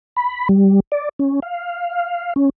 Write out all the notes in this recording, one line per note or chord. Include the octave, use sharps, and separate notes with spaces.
B5
G3
D5
C#4
F5
C#4